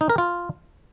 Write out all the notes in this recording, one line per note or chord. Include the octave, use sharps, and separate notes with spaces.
D#4
A#4
F4